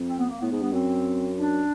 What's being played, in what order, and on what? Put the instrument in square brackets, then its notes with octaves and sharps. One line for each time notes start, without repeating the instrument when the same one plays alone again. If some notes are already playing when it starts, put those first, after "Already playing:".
Already playing: [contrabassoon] F2
[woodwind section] C4
B3
A#3
[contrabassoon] A2 [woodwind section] B3
[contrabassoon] G#2
[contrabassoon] G2 [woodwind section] B3
[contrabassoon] F#2 [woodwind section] C4
[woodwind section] D4